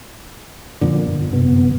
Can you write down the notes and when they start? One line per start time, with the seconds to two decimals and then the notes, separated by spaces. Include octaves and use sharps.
0.81 F2 A#2 D3
1.04 G1
1.33 F#2 C3 B3